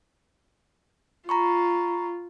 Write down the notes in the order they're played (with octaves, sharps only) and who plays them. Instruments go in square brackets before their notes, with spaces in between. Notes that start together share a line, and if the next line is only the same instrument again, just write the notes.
[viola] F4 [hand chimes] A#5 B5 C#6